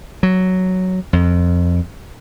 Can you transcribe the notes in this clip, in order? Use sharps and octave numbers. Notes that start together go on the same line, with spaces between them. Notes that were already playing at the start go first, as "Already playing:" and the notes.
F#3
F2